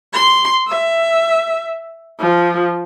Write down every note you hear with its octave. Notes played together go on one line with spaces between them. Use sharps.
C6
E5
F3